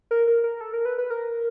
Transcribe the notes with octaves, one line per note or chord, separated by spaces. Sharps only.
A#4
A#4
A#4
A4
A#4
B4
B4
A#4